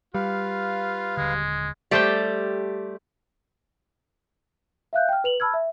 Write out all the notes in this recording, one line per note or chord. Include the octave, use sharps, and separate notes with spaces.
G3 F4 B4 F5
D#1 D3 G#3
G3 A3 G4 C5 G5
E5 F5 F#6 G6
G5 F6
B4 F7 F#7
A5 B5 E6 F6 G#6
E5